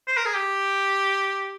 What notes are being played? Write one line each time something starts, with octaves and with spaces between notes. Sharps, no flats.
C5
A#4
G#4
G4